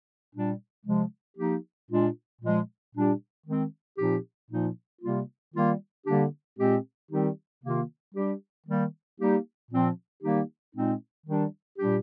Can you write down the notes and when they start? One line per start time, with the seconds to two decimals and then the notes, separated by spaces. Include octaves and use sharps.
0.33 A#2 G3 D4
0.85 C3 F3 G#3
1.37 F3 A#3 D#4 G4
1.89 A#2 G#3 D4 F4
2.41 A#2 F3 G#3
2.94 A#2 G3 D4 G4
3.46 D#3 G#3 C4
3.97 A#2 F3 C4 D#4 G4
4.50 A#2 F3 A#3 D#4
5.02 C3 G3 A#3 F4
5.54 D#3 G3 A#3 F4
6.06 D3 G3 A#3 D4 G4
6.58 A#2 G#3 C4 G4
7.10 D#3 G3 C4 D#4 G4
7.62 C3 D#3 A#3 F4
8.15 G3 D4 G4
8.66 D#3 G3 A#3
9.18 G3 A#3 D#4 G4
9.70 A#2 F3 C4 F4
10.23 D#3 G3 A#3 D#4 G4
10.74 A#2 G#3 C4 D#4
11.26 D#3 G3 D4 G4
11.78 A#2 G3 D4 G4